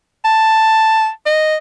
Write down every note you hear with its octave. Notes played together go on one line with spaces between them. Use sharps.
A5
D#5